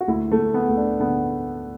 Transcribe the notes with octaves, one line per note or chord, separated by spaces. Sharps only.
F#4
D2 E4
A3
D2
B3
D2
D4
D3 B3